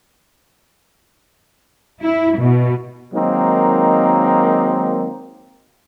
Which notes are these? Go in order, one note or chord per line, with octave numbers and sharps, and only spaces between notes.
E4
B2
D#3 F#3 G#3 A#3 C4 D#4